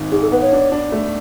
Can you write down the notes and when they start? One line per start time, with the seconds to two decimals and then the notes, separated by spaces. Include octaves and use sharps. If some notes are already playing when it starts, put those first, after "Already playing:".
Already playing: G#1 G#2
0.11 G#2 G#4
0.22 A4
0.32 B3 B4
0.42 C#5
0.52 D4
0.72 D4
0.92 A3